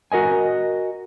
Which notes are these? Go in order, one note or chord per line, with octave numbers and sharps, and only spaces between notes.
F#4 A#4 D#5 G#5